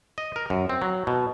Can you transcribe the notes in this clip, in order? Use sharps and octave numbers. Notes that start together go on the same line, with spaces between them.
D#5
A#4
F#2
C4
F#3
B2